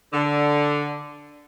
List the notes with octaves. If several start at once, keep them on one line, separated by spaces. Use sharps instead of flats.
D3